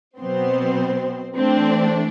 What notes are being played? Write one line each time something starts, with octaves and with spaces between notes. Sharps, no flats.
B2 F#3 B3 C4 C5
E3 A3 C4 D4 C5